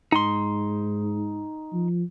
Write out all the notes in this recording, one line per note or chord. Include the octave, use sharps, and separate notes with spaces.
G#2 D#4 C6
F3